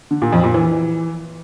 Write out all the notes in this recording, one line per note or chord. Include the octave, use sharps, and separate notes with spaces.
D3
A#2
F2
A#2
E3